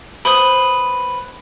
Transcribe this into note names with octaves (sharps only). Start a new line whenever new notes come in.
B4 C5 D#6